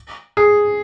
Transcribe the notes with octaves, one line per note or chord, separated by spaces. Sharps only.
G#4